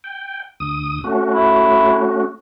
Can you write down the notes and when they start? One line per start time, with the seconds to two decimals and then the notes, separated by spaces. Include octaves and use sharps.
0.04 G5
0.60 D2 D#6
1.04 A3 C#4 F#4
1.34 E4